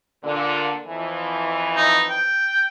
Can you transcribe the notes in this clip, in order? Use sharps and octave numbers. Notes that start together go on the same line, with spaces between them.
A#2 D3
F2 E3
D#4
G5